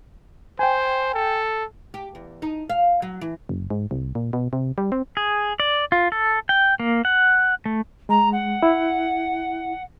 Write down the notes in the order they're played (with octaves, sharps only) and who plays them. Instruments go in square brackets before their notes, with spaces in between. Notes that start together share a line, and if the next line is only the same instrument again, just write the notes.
[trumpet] C5 [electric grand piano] G5 G#5
[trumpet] A4
[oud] G4
E2
D#4
F5
F#3
E3
[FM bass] F#1
G#2
C2
A#2
B2
C3
G3
C4
[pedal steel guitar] G#4
D5
F4
A4
G5
A#3
F#5
A3
[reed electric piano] G#3 [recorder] A#5
[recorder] F#5
[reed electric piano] E4